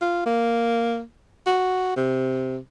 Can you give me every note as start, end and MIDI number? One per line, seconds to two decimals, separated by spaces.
0.01 0.25 65
0.26 1.01 58
1.46 1.95 66
1.96 2.57 48